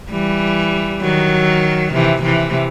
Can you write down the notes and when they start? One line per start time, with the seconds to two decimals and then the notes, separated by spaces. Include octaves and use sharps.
0.11 E3 G3
1.02 D#3 F#3
1.93 C3 E3
2.23 C3 E3